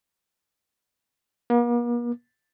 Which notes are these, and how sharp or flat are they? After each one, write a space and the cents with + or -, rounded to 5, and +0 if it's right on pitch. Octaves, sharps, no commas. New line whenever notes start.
A#3 +45